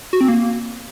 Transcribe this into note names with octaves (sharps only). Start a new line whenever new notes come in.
F#4
C4
A#3